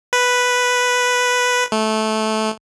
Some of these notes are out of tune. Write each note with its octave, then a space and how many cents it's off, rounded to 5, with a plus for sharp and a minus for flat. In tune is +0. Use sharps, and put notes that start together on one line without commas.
B4 +0
A3 -15